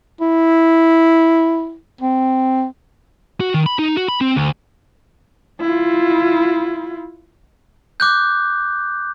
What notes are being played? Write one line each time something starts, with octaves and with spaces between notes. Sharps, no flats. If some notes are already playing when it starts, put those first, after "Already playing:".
E4
C4
F#4
D#3
B5
D#4
F#4
B5
C4
D2
E4 F4
D6 F#6 G6